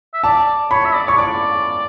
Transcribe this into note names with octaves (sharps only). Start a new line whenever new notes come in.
E5
D5 A5
C#5 B5
E5
D5
C#5 C#6
D5 D6